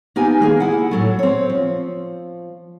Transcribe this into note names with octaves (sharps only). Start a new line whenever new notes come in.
A#3 B3 D#4 G4 G#5
D#3 A#3 G#4
E4 F#5
A2 F#3 A3
C4 C#5
F3